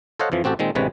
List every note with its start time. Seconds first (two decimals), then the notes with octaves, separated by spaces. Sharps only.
0.20 A4 C5 C#5 D#5 F5 F#5
0.32 F2 E3 F3
0.44 A1 C4 F#4 G4 A4
0.59 A#2 D#3 G#3 C4
0.75 A1 D2 C3 G#3 B4 C#5